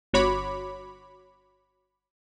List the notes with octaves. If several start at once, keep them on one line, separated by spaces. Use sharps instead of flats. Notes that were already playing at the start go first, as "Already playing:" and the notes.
G1 F#4 C#5 B5 D6